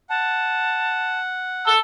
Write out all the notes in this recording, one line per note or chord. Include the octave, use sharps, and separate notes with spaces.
F#5 A5
A5 E6 G7